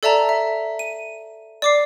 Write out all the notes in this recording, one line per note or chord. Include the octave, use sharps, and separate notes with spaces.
A4 D5 E5 A5 A#5
E5
D#7
D5 D6 C7